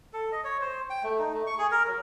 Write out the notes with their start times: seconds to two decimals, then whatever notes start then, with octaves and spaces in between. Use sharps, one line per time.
0.13 A4
0.32 D#5
0.44 C#5
0.61 C5
0.90 G5
1.04 A3
1.19 D#4
1.33 A3
1.47 C#6
1.58 G#4
1.71 A#4
1.87 F#3